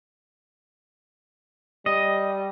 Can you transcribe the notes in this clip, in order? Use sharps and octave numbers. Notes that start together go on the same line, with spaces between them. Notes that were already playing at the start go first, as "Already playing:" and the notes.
G3 D#5